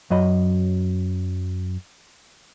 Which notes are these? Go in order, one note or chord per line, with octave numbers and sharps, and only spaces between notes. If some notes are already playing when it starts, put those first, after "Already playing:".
F#2 F#3 D#5 B5